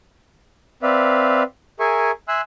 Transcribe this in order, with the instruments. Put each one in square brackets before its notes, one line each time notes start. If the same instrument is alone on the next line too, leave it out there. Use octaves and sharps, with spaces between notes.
[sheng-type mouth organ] C4 B4 D5 E5 F5
G#4 A#4 E5 G#5 C#6
E5 G#5 C6 E6 F#6